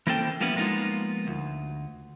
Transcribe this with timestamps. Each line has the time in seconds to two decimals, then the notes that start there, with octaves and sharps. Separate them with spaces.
0.07 E3 A#3 C4 C#4 A4 G5
0.41 F3 G3 A#3 B3 C#4 E4
0.55 F3 G#3 A#3 B3 D#4 F4
1.27 D2